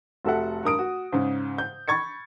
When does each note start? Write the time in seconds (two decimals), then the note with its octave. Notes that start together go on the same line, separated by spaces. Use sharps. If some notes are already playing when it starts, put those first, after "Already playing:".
0.25 F1 F#4 A4 E5 F#5
0.64 G2 A#4 D#6 D7
0.79 F#4
1.12 G#2 C#3
1.58 G6
1.88 B5 C#6 G#6 A6 C#7